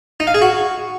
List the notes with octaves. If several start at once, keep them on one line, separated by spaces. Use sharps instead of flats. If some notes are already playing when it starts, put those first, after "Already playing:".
D#4
F5
G#4
F#4